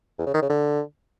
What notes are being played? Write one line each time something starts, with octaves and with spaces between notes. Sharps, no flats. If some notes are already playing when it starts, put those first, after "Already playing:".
E2
C#3
D#3
C#3
D3